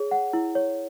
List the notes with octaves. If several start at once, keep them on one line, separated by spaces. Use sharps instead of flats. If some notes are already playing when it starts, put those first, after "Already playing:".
Already playing: G#4 C#5
F#5
E4
C#5